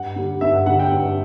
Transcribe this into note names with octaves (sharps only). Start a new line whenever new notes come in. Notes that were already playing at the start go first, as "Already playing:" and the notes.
Already playing: G2 F#5
D3 G3
G2 E5
F#5
D3 G3 F#5
G5
G2